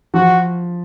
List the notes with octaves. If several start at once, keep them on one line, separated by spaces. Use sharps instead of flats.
F3 F#4